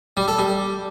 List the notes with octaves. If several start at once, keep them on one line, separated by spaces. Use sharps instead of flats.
G3
A4
G3